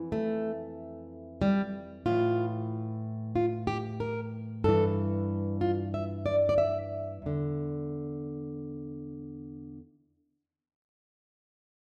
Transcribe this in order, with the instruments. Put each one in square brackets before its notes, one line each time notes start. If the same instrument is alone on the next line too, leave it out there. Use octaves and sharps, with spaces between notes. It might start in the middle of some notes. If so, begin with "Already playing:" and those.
Already playing: [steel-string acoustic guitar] F2 E3
A3
G3
A2 E3 F4
F4
G4
A#4
G2 E3 A4
F4
E5
D5
D5
E5
E2 D3